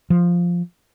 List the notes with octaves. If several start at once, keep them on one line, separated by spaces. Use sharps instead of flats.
F3